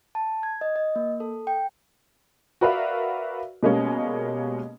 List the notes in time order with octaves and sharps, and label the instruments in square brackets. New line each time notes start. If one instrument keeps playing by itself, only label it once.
[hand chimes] A5
G#6
D#5
D#5
A#3
A4
G5
[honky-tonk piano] F#4 A#4 B4 D5 E5 F5
B2 G3 G#3 A#3 C#4